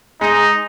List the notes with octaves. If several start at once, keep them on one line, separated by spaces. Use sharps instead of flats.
G#3 D#4